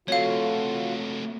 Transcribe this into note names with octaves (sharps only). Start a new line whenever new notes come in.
A3 C4 F4 F#4 A4 C#5 F5